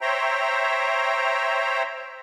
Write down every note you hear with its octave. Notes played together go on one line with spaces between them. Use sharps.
C5 C#5 E5 G5 A#5